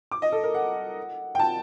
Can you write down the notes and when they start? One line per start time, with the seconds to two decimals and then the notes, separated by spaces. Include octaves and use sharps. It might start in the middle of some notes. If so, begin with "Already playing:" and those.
0.11 D6
0.22 D#5
0.32 A4
0.43 A#4
0.54 F#5
1.35 G5
1.39 A5